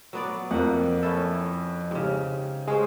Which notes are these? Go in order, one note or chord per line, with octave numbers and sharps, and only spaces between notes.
F#3 B3 D5
F2 A#3 F#5
C#4 E4 A4
G#2 C#3 G4
G#3 C#4 G#4 C5